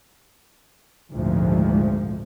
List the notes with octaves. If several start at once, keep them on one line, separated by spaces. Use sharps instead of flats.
G#1 D2 A#2 F3 G#3